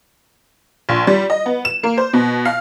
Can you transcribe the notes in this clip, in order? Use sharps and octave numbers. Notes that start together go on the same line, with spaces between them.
A#1
G3
D#5
B3
E7
A#3
C5
B2
F5